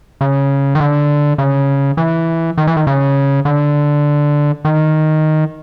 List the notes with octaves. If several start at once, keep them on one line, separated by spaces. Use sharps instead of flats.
C#3
D#3
D3
C#3
E3
D#3
E3
D#3
C#3
D3
D#3